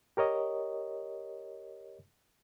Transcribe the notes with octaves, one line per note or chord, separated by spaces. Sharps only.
G4 A#4 C#5 D#5